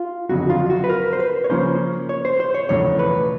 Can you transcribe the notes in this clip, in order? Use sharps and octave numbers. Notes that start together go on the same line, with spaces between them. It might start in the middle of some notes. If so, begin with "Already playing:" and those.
Already playing: F4
G1 F2 C#3 F#3 F#4
F4
F#4
B4
A#4
C5
B4
C#5
C#3 F3 A#3 C#4 C5
C#5
C5
C5
C#5
E1 E2 C#3 F3 A3 C#5
B4